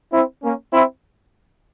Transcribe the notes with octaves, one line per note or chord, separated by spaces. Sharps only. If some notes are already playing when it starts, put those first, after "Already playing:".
C4 E4
A#3 C#4
C4 E4